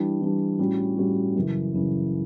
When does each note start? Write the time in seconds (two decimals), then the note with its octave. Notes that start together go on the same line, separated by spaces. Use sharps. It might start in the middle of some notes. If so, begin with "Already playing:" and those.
Already playing: E3 G3 D4
0.21 E3 G3 D4
0.59 A2 G3 C#4 F#4
0.97 A2 G3 C#4 F#4
1.36 F#2 C#3 E3
1.74 F#2 C#3 E3